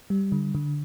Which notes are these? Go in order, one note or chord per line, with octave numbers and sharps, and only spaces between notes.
G3
D3
D3